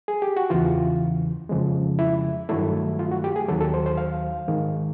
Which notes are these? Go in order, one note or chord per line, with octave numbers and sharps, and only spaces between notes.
G#4
G4
F#4
E2 C#3 E3 F4
F2 C#3 F3 G#3
E4
G2 D#3 F#3 A3 E4
F4
F#4
G4
G#4
D#2 D#3 F#3 A4
A4
C5
C5
F5
G#2 D#3 G#3